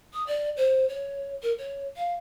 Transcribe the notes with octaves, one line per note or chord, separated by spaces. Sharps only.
D#6
D5
C5
C#5
A#4
C#5
F5